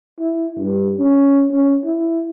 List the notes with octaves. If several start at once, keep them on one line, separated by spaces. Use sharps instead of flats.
E4
G2
C#4
C#4
E4